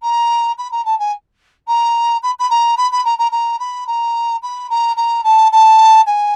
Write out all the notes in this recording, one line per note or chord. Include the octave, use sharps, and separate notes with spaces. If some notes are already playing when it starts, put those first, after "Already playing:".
A#5
B5
A#5
A5
G#5
A#5
B5
B5
A#5
B5
B5
A#5
A#5
A#5
B5
A#5
B5
A#5
A#5
A5
A5
G#5